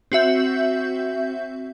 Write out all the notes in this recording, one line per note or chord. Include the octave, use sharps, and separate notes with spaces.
C4 F#4 E5 G6